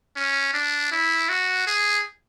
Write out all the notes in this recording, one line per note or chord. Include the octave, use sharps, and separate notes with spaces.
C#4
D4
E4
F#4
G#4